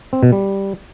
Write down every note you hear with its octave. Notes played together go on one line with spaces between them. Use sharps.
C4
B2
G3